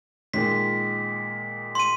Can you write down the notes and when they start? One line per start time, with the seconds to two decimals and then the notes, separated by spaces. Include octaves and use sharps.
0.34 A#2 D#3 G#3 B6
1.75 C6 D#7